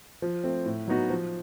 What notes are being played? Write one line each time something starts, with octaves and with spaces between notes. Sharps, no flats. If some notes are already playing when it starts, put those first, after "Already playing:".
F3
A3 C4
A2
F#3 B3 D#4 F#4
F3